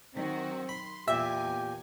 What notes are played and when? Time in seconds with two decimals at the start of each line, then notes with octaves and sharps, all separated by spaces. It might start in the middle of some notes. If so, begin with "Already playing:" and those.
0.15 D#3 F#3 C4 F#4
0.69 B5 C6
1.08 E2 A#2 G4 E5 G#5